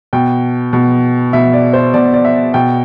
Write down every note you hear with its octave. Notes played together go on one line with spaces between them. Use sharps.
B2 G5
B2
B2 E5
D5
C5
B2 D5
D5
E5
B2 G5